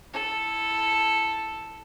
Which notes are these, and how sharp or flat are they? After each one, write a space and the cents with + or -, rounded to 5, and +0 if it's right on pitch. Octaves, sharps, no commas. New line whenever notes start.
E4 +0 A4 +0